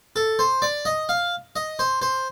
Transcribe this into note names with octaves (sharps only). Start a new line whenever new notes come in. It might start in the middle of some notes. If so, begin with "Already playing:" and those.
A4
C5
D5
D#5
F5
D#5
C5
C5